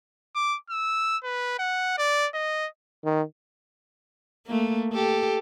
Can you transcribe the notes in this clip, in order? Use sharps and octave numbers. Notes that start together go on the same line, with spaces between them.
D6
E6
B4
F#5
D5
D#5
D#3
A3 A#3
G4 A4